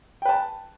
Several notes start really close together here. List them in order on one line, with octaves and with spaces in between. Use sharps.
G5 B4 A5